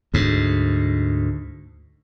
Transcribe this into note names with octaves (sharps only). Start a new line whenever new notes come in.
D2 G#2